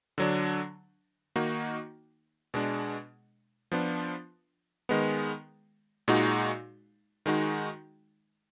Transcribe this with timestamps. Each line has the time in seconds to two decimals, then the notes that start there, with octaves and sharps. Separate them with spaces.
0.18 D3 F#3 D4
1.36 D#3 A#3 D#4 F#4
2.54 B2 G#3 D4
3.72 F3 B3 D4 F4
4.89 D#3 G#3 B3
6.08 A#2 G#3 D#4 F#4
7.26 D#3 G#3 D#4 F#4